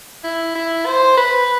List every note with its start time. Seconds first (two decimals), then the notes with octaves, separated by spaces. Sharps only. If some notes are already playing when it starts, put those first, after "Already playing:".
0.24 E4
0.55 E4
0.86 C5
1.18 B4